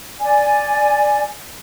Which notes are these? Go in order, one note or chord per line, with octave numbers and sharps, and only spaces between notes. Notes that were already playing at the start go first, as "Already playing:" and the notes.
D5 G#5